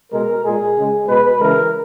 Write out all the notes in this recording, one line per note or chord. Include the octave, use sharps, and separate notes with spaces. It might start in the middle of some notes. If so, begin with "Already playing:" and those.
B2 G#3 A#4
A#2 G#3 G#4
C#3 G#3
B2 G#3 B4
C#3 E3 G#3 A#4